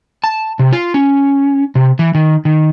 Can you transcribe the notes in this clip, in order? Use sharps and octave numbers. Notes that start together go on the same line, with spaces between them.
A5
C3
F4
C#4
C3
E3
D#3
D#3